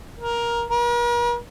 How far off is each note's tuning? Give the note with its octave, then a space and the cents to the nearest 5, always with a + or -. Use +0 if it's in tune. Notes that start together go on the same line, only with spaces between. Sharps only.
A#4 +15
A#4 +45